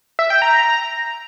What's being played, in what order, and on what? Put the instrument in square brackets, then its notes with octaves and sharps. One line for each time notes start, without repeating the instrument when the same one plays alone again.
[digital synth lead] E5
G5
A#5